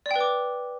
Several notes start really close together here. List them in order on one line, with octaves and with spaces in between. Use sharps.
D5 G5 B4 D6